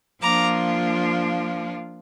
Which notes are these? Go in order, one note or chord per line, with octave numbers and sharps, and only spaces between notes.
F3 A#3 D4 F4 A#5 D6